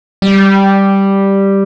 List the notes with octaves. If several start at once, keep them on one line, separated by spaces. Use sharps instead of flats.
G3